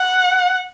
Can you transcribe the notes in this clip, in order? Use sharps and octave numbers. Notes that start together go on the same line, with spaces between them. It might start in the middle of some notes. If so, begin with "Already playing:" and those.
Already playing: F#5